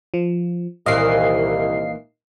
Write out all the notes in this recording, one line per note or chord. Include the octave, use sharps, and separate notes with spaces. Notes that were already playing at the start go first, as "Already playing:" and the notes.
F3
C2 A#2 D#3 E3 D#5 F5 C7